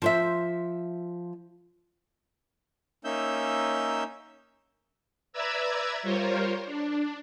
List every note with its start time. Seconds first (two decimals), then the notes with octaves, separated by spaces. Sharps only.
0.02 F3 C5 E5
3.04 A#3 C#4 D#4 E5 E6 G6
5.33 B4 D5 E5 A#5 E6 G#6
6.03 G3 F4 A#4 C5 C#5
6.65 D4